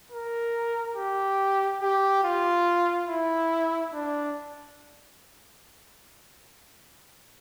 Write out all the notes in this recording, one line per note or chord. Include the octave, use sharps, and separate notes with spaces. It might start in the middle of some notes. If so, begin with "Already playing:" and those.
A#4
G4
G4
F4
E4
D4